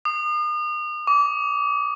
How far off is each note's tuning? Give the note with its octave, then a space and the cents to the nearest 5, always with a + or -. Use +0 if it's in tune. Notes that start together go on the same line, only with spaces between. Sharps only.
D#6 -40
D6 -30